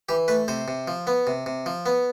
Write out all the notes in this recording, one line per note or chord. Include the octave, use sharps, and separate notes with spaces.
E3 G4
A3 B4
C3 C5
C3
F3
B3
C3
C3
F3
B3